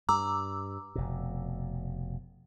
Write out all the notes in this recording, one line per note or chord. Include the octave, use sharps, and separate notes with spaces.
G2 A#5 D6 E6
F1 B2